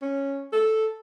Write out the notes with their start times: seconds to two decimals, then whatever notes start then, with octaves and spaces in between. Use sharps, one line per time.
0.02 C#4
0.52 A4